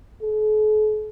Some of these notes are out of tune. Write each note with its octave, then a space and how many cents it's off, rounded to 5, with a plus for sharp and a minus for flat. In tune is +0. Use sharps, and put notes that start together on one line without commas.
A4 -45